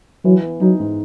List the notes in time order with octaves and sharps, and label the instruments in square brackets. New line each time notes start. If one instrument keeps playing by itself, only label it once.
[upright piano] E3 [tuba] F#3
[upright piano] B3
[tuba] F#3 [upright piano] D#4
[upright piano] G#2